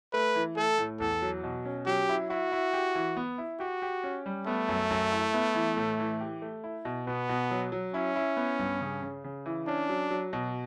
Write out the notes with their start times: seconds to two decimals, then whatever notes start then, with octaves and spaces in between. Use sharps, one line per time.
0.13 A3 B4
0.35 E3
0.57 A3 A4
0.78 A2
1.00 E2 A4
1.22 F#3
1.44 B2
1.65 C#4
1.86 F#3 G4
2.09 E4
2.30 E4 F#4
2.52 E4
2.73 G4
2.95 E3
3.17 B3
3.38 E4
3.60 F#4 G4
3.82 G4
4.04 C#4
4.26 G3
4.46 A3 B3
4.68 F#2
4.90 F#2
5.12 E4
5.34 B3
5.55 E3
5.77 A2
5.99 E3
6.20 G4
6.42 A3
6.64 E4
6.85 B2
7.07 B2 B3
7.29 B2
7.51 F#3
7.72 F#3
7.94 C#4 E4
8.16 E4
8.37 B3
8.59 G2
8.81 C#3
9.02 C#3
9.24 C#3
9.46 E3
9.67 C#4 D4
9.89 F#3
10.10 F#3
10.33 B2